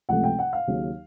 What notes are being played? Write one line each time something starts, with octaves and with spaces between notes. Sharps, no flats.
C#2 C3 F3 A3 F#5
G5
F#5
F5
D#2 C#3 F#3